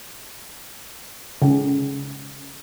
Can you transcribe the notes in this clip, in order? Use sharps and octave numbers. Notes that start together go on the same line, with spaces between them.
C#3